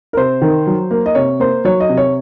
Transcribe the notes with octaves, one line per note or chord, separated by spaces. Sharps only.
A#4
C3 C5
D#3
F#3
A#3
D#5
C3 C#5
A#3 C5
F#3 C#5
D#5
C3
C#5